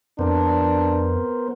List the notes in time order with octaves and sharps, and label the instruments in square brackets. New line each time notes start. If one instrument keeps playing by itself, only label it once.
[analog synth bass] F2 [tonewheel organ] B3 A#4 C5 [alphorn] D4